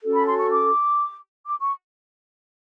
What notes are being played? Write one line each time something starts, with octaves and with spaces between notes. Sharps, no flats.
C#4 F#4 A4
B5
C6
C#6
D6
D6
C#6